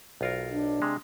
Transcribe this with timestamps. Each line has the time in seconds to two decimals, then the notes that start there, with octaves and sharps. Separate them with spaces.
0.21 B1 F4 A#4
0.51 D4
0.82 C3 G#3